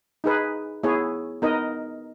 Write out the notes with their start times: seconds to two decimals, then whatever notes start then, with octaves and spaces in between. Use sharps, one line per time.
0.24 D#4 G#4 B4
0.83 B3 E4 G#4 C#5
1.42 B3 D#4 A#4 D#5